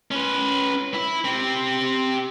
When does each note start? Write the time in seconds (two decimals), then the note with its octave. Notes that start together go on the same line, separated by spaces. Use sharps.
0.11 C#4 B4
0.94 E4
1.24 C4 G4